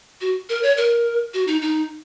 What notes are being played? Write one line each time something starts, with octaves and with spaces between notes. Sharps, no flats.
F#4
A#4
C#5
A#4
F#4
D#4
D#4